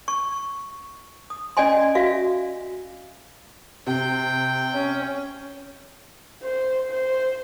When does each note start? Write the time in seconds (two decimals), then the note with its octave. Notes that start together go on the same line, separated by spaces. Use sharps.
0.08 C#6
1.30 D#6
1.57 C#4 D5 D#5 G#5 C6
1.95 F#4 E5 F5
3.87 C3 G5
4.74 C#4
6.42 C5
6.90 C5